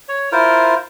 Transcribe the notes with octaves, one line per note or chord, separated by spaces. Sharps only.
C#5
E4 F4 A#4 C5